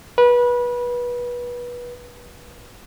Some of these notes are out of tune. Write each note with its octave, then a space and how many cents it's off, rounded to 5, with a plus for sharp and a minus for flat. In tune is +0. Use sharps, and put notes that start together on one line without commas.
B4 -25